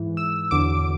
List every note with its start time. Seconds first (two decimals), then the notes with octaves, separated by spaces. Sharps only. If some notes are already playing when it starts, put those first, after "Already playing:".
Already playing: G#2 E3
0.17 E6
0.51 E2 D3 F#3 D6